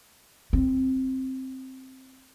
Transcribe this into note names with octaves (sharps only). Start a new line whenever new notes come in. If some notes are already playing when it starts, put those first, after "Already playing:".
C4